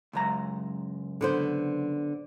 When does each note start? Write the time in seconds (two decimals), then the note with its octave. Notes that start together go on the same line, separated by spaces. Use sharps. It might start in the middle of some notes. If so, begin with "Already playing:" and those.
0.13 C#2 F#2 A#5
1.21 D3 B3 C5